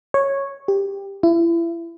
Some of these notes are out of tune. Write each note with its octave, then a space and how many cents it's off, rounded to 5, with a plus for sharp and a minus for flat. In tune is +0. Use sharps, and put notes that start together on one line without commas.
C#5 -10
G4 +15
E4 +30